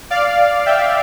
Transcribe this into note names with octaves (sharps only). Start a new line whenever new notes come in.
D5 F5
E5 G5